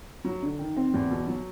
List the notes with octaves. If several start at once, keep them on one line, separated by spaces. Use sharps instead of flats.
F#3
D3
D#3
C4
E2
B2
F#3